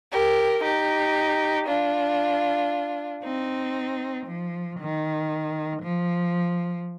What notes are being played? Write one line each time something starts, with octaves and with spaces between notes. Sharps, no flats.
G4 A#4
D#4 G4
D4 F4
C4 D#4
F3
D#3
F3